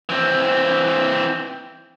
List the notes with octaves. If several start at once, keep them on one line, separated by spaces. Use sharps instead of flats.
E3 C4